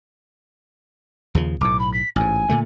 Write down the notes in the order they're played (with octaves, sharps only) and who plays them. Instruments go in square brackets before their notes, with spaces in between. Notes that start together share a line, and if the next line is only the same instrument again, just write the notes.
[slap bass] D#2 C#3 F3
[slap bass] B1 A2 [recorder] D6
[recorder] B5
B6
[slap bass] A1 G#2 [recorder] G#5
[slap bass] A#2 D3 A3